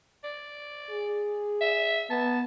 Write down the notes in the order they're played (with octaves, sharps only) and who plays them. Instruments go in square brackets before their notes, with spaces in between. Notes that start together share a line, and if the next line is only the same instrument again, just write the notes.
[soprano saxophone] D5
[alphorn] G#4
[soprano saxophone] E5
[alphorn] B3 [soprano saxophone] A5